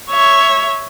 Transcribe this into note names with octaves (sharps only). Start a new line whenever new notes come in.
C#5 E5